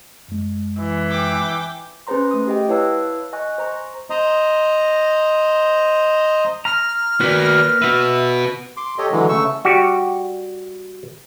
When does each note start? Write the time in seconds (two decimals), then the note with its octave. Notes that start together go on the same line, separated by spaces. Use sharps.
0.28 F#2 G#3
0.79 E3
1.09 G5 D6
2.07 C#4 G#4 B4 C5 A#5 C6
2.31 A3 D#6
2.47 G4 D#5 G5
2.68 E4 B4 C#5 F5 A5 E6
3.33 D#5 G#5 C#6 F#6
3.58 C5 A#5 C#6
4.10 C5 D#5 A#5
6.65 A#5 F6
7.21 A#3 F#4 B4 D5
7.82 F#4 B4 E5
8.77 C6 D6
8.98 G4 A4 C#5 D#5
9.12 D3 E3 F#3 G#3
9.29 C#3 A3 C#6 E6
9.65 G3 F#4 G4